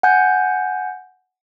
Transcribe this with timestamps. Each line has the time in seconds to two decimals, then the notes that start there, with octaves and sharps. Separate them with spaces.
0.03 F#5 G#5 G6